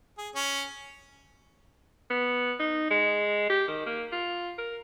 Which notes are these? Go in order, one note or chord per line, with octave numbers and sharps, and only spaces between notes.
G#4
C#4
B3
D#4
G#3
G4
D#3
A#3
F4
A#4